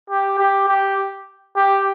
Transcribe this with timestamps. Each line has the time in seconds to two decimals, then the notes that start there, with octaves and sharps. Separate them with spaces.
0.10 G4
0.38 G4
0.68 G4
1.56 G4